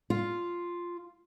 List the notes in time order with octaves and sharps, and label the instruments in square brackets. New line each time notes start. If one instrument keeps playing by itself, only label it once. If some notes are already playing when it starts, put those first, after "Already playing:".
[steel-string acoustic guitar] F4